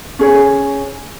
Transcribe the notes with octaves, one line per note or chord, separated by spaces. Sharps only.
C#4 G#4 C#5